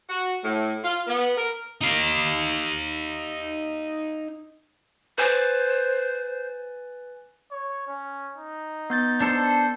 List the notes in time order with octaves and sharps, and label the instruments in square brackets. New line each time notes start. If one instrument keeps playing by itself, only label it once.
[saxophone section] F#4
A2
F4
B3
A#4
[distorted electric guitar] D#4 F5
[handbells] B4 G#5 A6 [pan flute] C5
[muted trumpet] C#5
C#4
D#4
[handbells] B3 G6 A6
[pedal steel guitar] D4 A4 C5